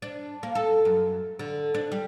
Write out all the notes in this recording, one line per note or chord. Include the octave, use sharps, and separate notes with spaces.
D4
A#3
A4
F#2
D3
D4
G3